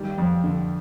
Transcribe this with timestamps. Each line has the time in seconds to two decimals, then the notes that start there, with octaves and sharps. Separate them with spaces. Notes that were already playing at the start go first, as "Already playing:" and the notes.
Already playing: D#3 G3
0.18 F2
0.44 D3